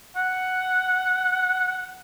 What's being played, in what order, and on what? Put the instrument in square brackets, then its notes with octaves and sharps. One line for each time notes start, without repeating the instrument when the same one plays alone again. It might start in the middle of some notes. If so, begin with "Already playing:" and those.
[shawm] F#5